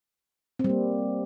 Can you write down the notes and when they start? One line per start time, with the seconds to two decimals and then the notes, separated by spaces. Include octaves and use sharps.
0.59 C4
0.64 G3
0.69 A#3